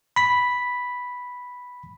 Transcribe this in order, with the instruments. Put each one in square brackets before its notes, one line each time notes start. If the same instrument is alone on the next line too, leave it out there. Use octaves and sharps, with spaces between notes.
[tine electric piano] B5 B6